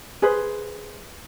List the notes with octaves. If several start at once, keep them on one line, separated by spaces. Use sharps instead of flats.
G#4 B4 C5